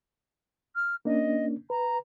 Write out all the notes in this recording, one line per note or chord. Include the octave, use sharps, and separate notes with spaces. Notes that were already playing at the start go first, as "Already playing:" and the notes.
F6
A#3 C#4 D4 D#5
B4 A#5